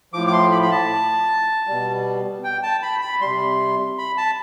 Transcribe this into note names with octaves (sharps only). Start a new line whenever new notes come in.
A2 F3 D6
D6
C6
B5
B5
A5
B2 G3
G5
A5
B5
B5
C3 G3 C6
B5
A5